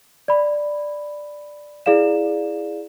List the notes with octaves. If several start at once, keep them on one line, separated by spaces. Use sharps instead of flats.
D5 B5
E4 G#4 D5 F5 E7